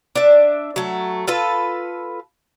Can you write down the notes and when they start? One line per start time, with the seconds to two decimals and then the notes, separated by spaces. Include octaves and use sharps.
0.15 D4 E5
0.76 F#3 A3
1.28 F4 A4 B4